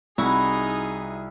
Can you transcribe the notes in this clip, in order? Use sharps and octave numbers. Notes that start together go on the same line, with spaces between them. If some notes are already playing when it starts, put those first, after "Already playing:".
C2 D#4 E4 F#4 G#4